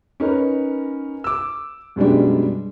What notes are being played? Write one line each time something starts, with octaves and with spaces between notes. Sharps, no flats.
C#4 D#4 A#4 B4
D6 E6
F#2 B2 G3 G#3 D4